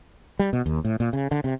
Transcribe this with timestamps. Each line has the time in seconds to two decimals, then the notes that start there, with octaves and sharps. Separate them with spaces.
0.39 G3
0.53 B2
0.66 D#2
0.85 A2
1.00 A#2
1.13 C#3
1.31 D3
1.44 C3